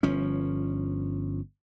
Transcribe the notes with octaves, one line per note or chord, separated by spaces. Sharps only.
G1 F3 C#4